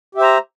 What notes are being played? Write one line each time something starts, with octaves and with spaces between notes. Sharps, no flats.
G4 C5 E5 A#5